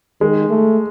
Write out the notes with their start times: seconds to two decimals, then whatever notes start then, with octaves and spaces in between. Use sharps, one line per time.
0.21 D#3 G#3
0.49 A3